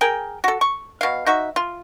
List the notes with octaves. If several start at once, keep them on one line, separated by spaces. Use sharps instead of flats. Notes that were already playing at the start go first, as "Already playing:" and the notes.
G#4 A#4 G5
F#4 A4
C#6
B2 F5
D#4 F#4 E5
F4